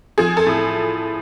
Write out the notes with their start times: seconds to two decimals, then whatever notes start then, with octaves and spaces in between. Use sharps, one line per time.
0.18 F3 G#4
0.37 A4
0.46 A2